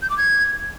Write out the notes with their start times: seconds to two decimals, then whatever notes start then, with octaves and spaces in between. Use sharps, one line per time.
0.02 G6
0.10 D6
0.18 G#6